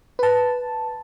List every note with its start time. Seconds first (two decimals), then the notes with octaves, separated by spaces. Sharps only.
0.19 B4 A5